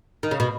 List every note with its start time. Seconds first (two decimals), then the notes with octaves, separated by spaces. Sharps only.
0.23 D#3
0.31 C#3
0.40 B2